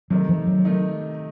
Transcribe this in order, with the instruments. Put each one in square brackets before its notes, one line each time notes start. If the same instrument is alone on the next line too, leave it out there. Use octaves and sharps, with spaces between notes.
[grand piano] C3 D#3 A3 D#4 [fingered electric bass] F#3
[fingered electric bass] F3
F#3
[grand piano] C3 D#3 A3 D#4